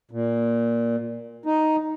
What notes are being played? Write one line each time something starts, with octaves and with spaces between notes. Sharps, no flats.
A#2
D#4